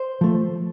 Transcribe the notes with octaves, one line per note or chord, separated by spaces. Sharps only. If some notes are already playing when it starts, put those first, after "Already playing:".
Already playing: C5
F3 A3